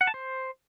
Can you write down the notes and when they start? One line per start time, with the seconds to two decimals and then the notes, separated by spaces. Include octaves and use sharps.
0.01 F#5
0.07 A5
0.14 C5